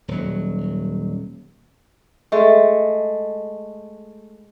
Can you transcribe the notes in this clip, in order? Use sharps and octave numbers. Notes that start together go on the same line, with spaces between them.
D#1 F#3
G#3 A3